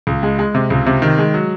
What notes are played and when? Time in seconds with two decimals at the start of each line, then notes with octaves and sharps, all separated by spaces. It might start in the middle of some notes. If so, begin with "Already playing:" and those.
0.07 C#2
0.23 G#3
0.39 G#3
0.55 C3
0.70 C#2
0.86 C3
1.02 D#3
1.18 G#3
1.34 F#3